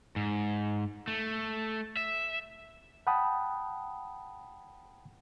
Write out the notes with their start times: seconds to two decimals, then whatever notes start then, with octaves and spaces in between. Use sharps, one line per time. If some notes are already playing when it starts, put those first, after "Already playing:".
0.16 G#2
1.08 A3
1.97 E5
3.07 F#5 G5 A5 B5 D#6